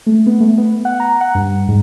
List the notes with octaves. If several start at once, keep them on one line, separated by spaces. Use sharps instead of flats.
A3
B3
A3
B3
F#5
A#5
F#5
G2
G#2